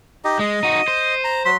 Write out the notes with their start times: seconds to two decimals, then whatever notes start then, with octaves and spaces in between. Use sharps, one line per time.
0.24 D#4 G4 D#5
0.39 G#3 D#5
0.63 D#4 F#4 D#7
0.88 C5
1.24 A#5
1.45 F#3 C6 B6